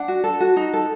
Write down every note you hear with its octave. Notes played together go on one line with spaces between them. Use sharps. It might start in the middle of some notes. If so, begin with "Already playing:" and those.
Already playing: D4 F#5
F#4
A4
F#4
D#4
A4